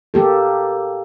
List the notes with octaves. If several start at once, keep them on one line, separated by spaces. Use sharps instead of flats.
A#3 G4 A4